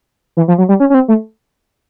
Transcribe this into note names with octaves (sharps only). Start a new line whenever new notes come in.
E3
F3
F#3
G3
C#4
C#4
C4
A3